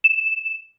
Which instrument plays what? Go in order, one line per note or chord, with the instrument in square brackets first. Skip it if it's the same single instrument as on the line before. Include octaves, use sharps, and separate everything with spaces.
[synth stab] E7